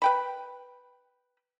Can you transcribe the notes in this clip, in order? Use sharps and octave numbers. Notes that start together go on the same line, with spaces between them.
B4 G5 B5